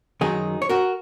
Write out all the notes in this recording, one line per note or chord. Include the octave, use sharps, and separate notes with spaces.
F#2 D#3 F#3 D#4 G#4
C#5
F#4 A#4